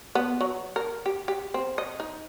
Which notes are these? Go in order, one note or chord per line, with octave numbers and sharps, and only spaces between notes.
B3
F#3
A#4
G4
G4
C4
D#5
D#4